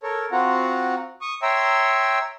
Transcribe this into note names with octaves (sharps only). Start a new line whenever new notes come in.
A4 A#4 C#5
C4 F4 F#4 F#5 A#5
C#6 D#6
C#5 E5 G5 A#5 C6 E6